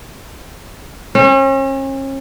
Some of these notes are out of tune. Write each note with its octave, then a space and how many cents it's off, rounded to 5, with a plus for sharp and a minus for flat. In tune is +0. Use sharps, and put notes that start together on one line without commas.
C#4 -40